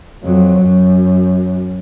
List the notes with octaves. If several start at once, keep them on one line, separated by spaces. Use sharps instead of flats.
F2 F#3
F#2